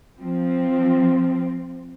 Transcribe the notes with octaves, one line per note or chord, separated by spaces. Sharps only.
F3 C4